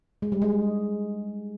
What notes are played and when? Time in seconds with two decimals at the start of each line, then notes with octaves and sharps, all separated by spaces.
0.22 G#3
0.32 G3
0.42 G#3